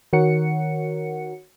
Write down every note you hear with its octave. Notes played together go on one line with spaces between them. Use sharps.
D#3 F#4 A#4 C#5 F#5 C#7